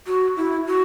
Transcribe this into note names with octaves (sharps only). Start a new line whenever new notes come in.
F#4
E4
F#4